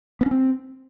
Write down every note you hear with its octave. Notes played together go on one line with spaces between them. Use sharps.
B3
C#4
C4